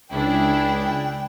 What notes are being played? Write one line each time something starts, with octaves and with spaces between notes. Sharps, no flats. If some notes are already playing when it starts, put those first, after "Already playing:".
C#2 D4 E4 G#4 G5